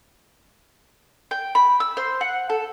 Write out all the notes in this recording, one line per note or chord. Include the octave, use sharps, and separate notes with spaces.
G5
B5
E6
C5
F#5
A4